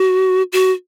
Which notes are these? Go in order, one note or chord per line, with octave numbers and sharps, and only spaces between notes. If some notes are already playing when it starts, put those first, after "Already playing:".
Already playing: F#4
F#4